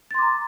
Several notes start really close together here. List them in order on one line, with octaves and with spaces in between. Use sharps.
A6 C6 D6 A#5